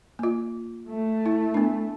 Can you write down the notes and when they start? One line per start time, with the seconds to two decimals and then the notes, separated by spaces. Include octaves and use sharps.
0.19 A#3 F4
0.89 A3
1.26 E4
1.54 B3 D4